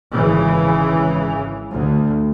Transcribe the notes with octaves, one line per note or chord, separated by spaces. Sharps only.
G#1 C#3 E3
D2